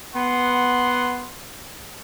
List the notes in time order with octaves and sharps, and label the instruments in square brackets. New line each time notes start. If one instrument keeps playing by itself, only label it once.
[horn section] B3 F#5 C6